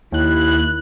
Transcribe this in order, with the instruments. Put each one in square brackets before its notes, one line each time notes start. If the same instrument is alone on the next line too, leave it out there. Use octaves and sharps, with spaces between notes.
[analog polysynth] D#2 F#6 [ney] E4